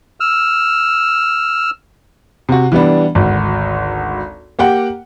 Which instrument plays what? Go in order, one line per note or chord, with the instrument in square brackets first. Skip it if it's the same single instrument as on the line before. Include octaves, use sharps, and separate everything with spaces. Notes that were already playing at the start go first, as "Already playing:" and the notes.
[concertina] E6 F6
[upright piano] C3 F#4
E3 G3 B3 D4
G#1 D2
A#3 G4 F#5 G5